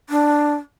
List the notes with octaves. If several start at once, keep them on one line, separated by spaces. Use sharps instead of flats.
D4